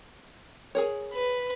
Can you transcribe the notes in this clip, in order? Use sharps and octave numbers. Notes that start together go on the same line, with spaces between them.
G#4 A#4 C#5
B4